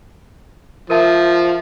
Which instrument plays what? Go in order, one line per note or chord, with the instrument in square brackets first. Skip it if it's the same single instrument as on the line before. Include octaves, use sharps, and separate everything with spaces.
[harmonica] F3 [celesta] A#4 E5 A5